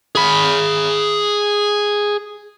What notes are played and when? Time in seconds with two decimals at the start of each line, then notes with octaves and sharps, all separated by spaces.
0.15 G#4 B5